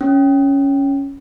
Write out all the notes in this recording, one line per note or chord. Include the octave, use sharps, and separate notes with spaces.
C#4